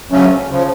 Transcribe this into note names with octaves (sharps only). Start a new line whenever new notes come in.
D2 C#3 F#3 A3 C#4
C#3 F3